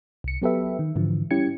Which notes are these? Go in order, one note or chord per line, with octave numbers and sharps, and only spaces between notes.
C2 C#7
F#3 B3 G4 A4 B4 E5
D#3
G#2 D3 E3 F3
G3 C#4 E4 G4 G#6 C#7